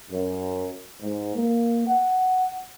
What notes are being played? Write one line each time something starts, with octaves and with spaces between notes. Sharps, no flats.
F#2
G#2
A#3
F#5